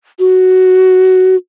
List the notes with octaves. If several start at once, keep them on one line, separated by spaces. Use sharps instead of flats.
F#4